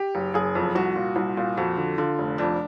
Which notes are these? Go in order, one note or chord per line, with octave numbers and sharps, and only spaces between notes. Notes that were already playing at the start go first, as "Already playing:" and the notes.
Already playing: G4
F#1
F#1 G#4
F2
C2 F#4
A#2
C2
A#2
F2 F#4
D3
D3 F4
F1
F2 D4